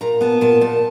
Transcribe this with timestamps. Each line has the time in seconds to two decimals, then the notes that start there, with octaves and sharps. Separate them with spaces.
0.01 A#2 A#5
0.21 B3 A5
0.41 A#2 A5
0.61 A#2 A5